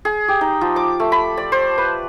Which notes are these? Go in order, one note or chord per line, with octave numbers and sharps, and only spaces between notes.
G#4
G4
D#4
F3
D6
A3
B5
D5
C5
B4